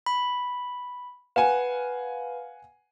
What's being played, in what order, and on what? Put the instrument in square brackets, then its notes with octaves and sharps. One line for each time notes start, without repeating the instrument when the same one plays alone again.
[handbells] B5
[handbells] B4 [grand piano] F5 F#5 G#5